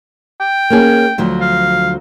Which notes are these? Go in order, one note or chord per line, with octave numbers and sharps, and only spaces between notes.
G5
A#3 C#4 G#4
D2 F3 F#3
F5